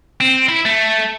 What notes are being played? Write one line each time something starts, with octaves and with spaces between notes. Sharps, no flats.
C4
E4
A3